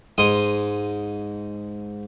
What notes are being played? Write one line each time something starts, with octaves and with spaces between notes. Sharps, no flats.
G#2 C6 D#6